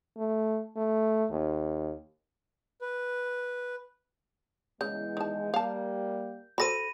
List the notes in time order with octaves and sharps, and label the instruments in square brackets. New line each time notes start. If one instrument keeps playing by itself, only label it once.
[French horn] A3
A3
D#2
[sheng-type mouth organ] B4
[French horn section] E2 G#3 [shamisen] C#3 [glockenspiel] G6
[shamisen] D#3 A5
[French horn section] G3 A#3 [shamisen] F5 A5
[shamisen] F#4 A4 C5 [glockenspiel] B5 A#6 D#7